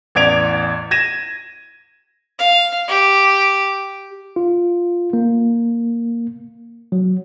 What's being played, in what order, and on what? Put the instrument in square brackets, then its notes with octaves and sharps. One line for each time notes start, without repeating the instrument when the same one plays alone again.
[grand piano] A1 E2 D5 G#6 D7 F7
G#6 A#6 D#7 E7
[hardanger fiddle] F5
G4
[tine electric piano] F4
A#3
F#3